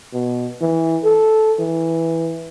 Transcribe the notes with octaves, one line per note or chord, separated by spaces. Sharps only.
B2
E3
A4
E3